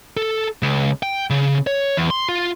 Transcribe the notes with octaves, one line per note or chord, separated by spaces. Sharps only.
A4
C#2
G5
C#3
C#5
E2
C6
F4